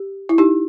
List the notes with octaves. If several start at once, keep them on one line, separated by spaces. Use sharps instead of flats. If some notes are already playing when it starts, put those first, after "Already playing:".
Already playing: G4
E4
D#4 G4